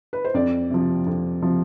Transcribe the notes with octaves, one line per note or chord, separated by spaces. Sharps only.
B4
C5
F2 D5
C3 F3
F2
C3 F3